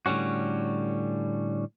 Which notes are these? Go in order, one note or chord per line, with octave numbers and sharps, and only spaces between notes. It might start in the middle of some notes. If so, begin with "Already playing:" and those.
A2 D3 G3 C#4 F#4